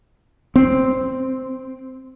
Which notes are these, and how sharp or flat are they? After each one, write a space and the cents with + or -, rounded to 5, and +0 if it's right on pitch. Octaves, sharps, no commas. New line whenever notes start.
C4 -5